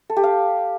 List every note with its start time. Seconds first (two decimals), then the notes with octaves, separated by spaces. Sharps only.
0.10 A4
0.16 G4
0.23 F5